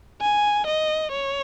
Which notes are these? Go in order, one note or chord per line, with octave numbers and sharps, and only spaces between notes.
G#5
D#5
C#5